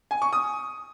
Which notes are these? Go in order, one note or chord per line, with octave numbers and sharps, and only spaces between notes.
G#5
C#6
D#6